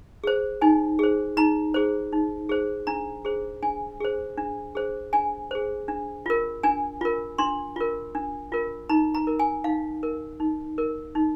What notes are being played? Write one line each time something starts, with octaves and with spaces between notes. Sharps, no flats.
G#4 C5
D#4 G#5
G#4 C5
D#4 A#5
G#4 C5
D#4
G#4 C5
D4 A#5
G#4 C5
D4 G#5
G#4 C5
D4
G#4 C5
D4 G#5
G#4 C5
D4
F4 A#4
D4 G#5
F4 A#4
D4 C6
F4 A#4
D4
F4 A#4
D#4 A#5
A#5
A#4
G#5
D#4 F5
A#4
D#4
A#4
D#4